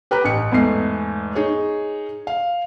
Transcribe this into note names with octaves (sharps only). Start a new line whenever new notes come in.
G4 B4 G5 A#5 F#6
A1 C#7
E2 G#2 A3 C7
D#4 G#4 C#5
F5